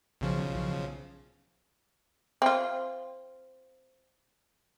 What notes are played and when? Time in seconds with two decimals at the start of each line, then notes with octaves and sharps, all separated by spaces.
0.21 B1 C#3 F3
2.42 C4 F4